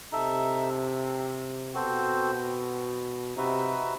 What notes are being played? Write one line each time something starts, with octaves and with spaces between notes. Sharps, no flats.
C3 D#4 A4 E5
B2 C4 F#4 A4 C5
C3 D#4 F#4 B4 E5